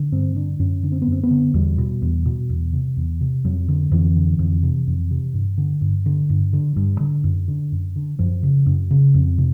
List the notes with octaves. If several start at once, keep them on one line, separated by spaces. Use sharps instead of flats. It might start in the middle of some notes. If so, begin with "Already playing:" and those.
Already playing: D3
G2 C4
D3 D4
F#2 C#4
D3
C4
B3
F#2 C4
B3
D3
E2 G3
B2
E2
B2
E2
C3
E2
C3
F2 F#3
D3
F2 E3
D3
F2
C3
F2
C3
G2
D3
G2
D3
G2
D3
G2
D3
F#2
D3
F#2
D3
F#2 F3
C#3
F#2
C#3
F2
C3